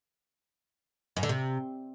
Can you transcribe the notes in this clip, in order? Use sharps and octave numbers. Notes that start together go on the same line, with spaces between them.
F#2
D3
C3